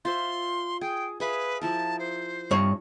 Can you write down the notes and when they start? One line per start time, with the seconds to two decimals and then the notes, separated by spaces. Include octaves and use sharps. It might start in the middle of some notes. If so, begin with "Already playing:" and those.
0.05 F4 C5 E5 C6
0.81 G#4 G5
1.20 G#4 B4 E5 F5
1.61 F3 E4 A#4 A5
1.99 C5
2.51 G2 C#5